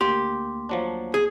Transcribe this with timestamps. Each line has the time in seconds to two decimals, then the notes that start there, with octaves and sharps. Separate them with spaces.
0.01 D2 A#3 G4 C6
0.69 F3 F#3 D4
1.14 G#4